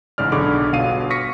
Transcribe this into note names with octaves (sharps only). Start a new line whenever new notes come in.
A1 G#2 C#3 D5 F6
B1 D3 G#4 B5 C#6 D6
G1 B2 F5 D#7
C#6 A#6 B6 C#7